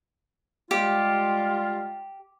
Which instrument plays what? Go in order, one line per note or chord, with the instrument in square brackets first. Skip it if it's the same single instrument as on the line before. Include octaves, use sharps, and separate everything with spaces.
[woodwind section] G3 G#3 F4 [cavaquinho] G4